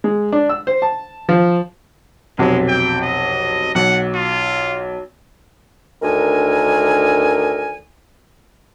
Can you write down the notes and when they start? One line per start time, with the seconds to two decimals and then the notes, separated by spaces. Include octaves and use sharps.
0.04 G#3
0.32 D4
0.49 E6
0.67 C5
0.82 A5
1.29 F3
2.38 F1 B1 G#3
2.68 G5
3.02 D#5
3.75 B1 F#5
4.15 F4
6.02 D2 D#3 D4 A#4 G#5